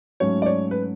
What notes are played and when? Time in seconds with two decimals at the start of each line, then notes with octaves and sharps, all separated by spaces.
0.20 G#2 F#3 A3 C#4 C#5
0.42 D5
0.46 C#5
0.71 B4